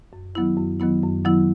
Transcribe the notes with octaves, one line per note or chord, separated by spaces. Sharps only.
F#2
D#3 F#3 B3 E4
F#2
D#3 F#3 B3 E4
F#2
D#3 F#3 B3 E4